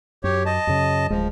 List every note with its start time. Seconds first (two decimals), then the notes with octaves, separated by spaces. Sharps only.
0.24 F#2 G4 C#5
0.46 D#5 A5
0.67 F#2 C#3
1.10 D1 F3 G#3